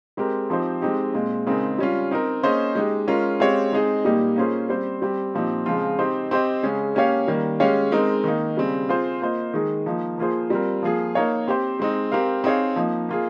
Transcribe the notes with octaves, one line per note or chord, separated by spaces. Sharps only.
G#3 C4 G4 A#4
F3 C4 D#4 G4 C5
G#3 C4 D#4 G4
A#2 G#3 C4
C#3 G#3 C4 D#4 A#4
G3 C#4 F4
C4 D#4 A#4
A#3 C#4 G#4 C5 D#5
G#3 D#4 G4
G#3 C#4 F4 A#4
G#3 C4 G4 C#5 F5
G#3 C4 D#4 G#4 D#5
A#2 G3 A#3 D#4 G4
A#3 C#4 F4 G#4 C5
G3 C4 G4 C5
G3 C4 G4
A#2 F3 C4 D#4 G4
C#3 F3 G#3 C4 F4
C4 D#4 G4 C5 D#5
C4 G4 C5 D#5
C#3 G#3 C#4 G#4
A#3 C#4 G4 C#5 F5
D#3 G3 A#3
G#3 C#4 G4 C#5 F5
G#3 C4 D#4 A#4
D#3 A#3 D#4
C#3 G3 C4
C4 F4 G#4 C5
A#3 F4 C5 D#5
D#3 G#3 D#4 G#4
F3 A#3 D#4
F3 A#3 F4 G#4 C5
G3 C4 F4 A#4
F3 A#3 F4 G#4
A#3 D#4 A#4 C#5 F5
C4 G4 C5
G#3 C4 D#4
C4 G4 A#4 F5
C4 D#4 G#4 C#5 F5
F3 A#3 D#4
A#3 F4 G#4